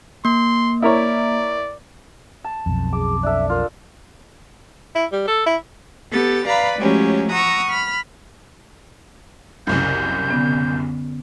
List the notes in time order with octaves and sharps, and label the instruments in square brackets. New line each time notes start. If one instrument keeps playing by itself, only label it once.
[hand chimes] A#3 [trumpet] C6
[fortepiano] E4 A#4 C#5 [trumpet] D5
[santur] A5
[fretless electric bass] B1 F2
[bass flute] G#4 [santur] D6
[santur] D4 A4 [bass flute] E5
[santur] F4 [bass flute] A#4
[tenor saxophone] E4
G3
A4
E4
[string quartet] B3 G4 A4 A6
B4 D5 F5 A#5 B5
F3 F#3 G#3 A3 C#4 G4
F#5 A#5 C#6 D#6 E6
B5 F6
[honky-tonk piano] F#1 C2 F#2 [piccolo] G6
[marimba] D3 B3 C#4